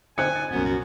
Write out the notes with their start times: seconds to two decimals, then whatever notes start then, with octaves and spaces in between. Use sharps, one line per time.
0.18 D3 C4 D#4 G#5 F#6 C#7
0.36 A6
0.51 C2 F#2 A#2 B3
0.65 F#4